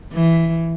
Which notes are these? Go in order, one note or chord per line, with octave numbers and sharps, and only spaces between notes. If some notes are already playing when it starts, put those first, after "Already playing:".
E3